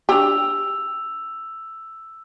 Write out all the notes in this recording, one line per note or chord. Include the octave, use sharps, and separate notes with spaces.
D4 G4 C#6 E6 F7